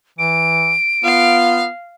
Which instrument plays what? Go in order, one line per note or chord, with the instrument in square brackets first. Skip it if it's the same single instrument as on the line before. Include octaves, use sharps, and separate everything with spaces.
[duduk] E3 [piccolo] D7
[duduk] B3 [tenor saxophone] F4 [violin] F5